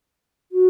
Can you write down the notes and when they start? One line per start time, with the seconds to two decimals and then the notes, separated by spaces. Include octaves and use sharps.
0.52 F#4